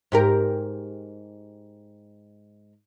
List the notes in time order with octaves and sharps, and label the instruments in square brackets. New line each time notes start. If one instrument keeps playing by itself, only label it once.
[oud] G#2 G4 A#4